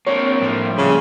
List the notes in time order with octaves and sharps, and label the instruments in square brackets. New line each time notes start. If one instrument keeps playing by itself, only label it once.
[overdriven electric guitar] A#3 D4 [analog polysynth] C4 [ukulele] C#5
[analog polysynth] A2 F3 G3
[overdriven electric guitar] A#2 [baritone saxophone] C#3